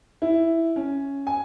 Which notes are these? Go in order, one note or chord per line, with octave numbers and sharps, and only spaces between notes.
E4
C#4
G#5